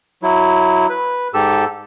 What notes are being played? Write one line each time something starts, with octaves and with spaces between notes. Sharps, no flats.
F#3 E4
B4
G#2 G4 A4 E6